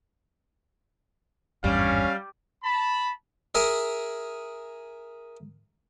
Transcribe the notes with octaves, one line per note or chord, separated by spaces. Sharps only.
G#1 E2 G2 G3 C#4 F5
A5 B5
G#4 A#4 E5